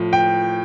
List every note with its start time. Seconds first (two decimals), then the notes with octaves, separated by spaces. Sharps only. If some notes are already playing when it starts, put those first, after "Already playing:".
Already playing: A2 F3
0.13 G5